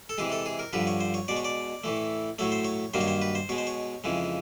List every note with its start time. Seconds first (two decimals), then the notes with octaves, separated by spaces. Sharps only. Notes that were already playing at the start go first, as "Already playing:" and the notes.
0.09 A4
0.18 C3 E3 G#3 G#4
0.32 A4
0.46 G#4
0.59 A#4
0.73 G2 D3 F3 B4
0.87 C#5
1.00 C5
1.14 C#5
1.28 B2 G#3 D5
1.37 C#5
1.45 D5
1.84 A2 E3 A3
2.39 A2 F#3 A3 C#5
2.52 C5
2.65 C#5
2.94 G2 D#3 F#3 A#3 C5
3.01 C#5
3.08 C5
3.22 B4
3.35 C5
3.49 B2 G#3 C#5
3.58 C5
3.67 C#5
4.04 F2 C#3 E3 G#3